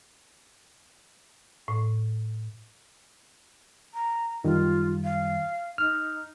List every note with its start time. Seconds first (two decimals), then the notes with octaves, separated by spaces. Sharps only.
1.68 A2
3.94 A#5
4.44 F#2 D#3 G3 F4
5.04 F5
5.78 D#4 F6